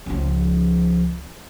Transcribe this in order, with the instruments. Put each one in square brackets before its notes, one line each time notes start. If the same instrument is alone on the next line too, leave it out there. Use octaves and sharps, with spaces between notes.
[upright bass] C#2 F3